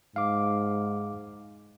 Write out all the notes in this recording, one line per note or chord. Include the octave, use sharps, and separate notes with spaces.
G#2 F5 D6